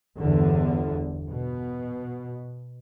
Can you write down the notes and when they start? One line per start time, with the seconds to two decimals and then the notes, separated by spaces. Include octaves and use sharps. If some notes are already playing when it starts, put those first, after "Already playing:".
0.18 G1 E2 D3
1.30 B2